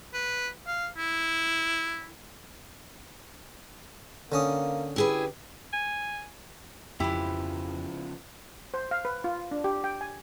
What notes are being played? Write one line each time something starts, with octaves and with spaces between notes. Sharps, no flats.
B4
F5
E4
D3 A#3 C#4 D#6
E4 G4 G#4 B4
G#5
F2 C#3 E3 F3 E4 G4
C5
F5
B4
F4
D4
G4
G5
G#5